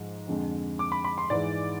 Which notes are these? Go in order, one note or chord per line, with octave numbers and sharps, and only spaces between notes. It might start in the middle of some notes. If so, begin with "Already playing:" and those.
Already playing: G#2 F3 G#3
F2 D3 G#3
D6
B5
B5
C6
G#2 E3 G#3 D5